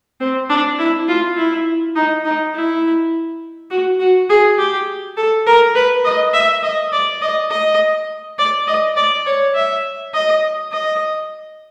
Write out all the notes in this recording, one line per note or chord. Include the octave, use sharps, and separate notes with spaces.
C4
D4
E4
F4
E4
D#4
D#4
E4
F#4
F#4
G#4
G4
A4
A#4
B4
D#5
E5
D#5
D5
D#5
D#5
D5
D#5
D5
C#5
E5
D#5
D#5